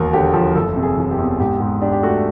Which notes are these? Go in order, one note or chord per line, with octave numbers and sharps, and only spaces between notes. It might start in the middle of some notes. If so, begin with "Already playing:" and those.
Already playing: E1 D#2 A#4
D3 G4
F3
F#1 A4
C3
G#4
E3
G4
E2
G#2 G4
G#2 G4
D4 G4
G4
A3 F#4